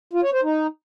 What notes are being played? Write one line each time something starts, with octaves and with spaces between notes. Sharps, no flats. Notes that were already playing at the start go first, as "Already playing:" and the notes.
F4
C#5
C5
D#4